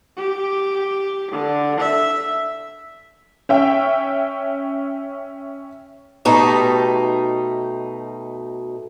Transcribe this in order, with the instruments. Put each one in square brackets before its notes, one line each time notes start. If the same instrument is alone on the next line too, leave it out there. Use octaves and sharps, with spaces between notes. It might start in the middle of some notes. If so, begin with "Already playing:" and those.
[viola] G4
D3
E5
[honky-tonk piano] C#4 E5 G5
[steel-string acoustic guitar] B2 A3 D#4 G4